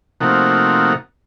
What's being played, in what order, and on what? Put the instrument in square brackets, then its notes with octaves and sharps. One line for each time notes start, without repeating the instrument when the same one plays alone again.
[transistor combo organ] C3 F3 A3 A#3 D#4 F#4